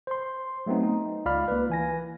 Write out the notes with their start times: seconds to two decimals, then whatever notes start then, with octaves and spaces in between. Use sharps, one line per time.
0.07 C5 C6
0.66 F#3 A3 B3 C4 D#4
0.83 D#4
1.26 C#2 F4 D5 F5 B5 F6
1.48 A#3 B4
1.70 E3 G#5 A#6